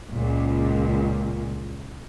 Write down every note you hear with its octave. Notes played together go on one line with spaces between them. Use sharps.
C#2 A#2